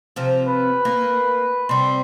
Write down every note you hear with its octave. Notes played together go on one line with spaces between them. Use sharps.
C3 F3
B4
A#3
C3 G3 C6